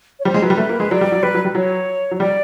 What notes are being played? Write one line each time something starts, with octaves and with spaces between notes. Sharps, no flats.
C#5
G3 C5
G#3
F#3 B4
G3
A3
A#3
G#3
F#3 D5
G3
F#3
G3 B4
F#3
G3
F#3 C#5
F#3
C#5
G3 D5